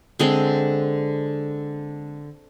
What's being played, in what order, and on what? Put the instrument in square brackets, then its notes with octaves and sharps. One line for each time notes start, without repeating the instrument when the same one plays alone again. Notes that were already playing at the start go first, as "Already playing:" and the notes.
[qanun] D3 G#3 C4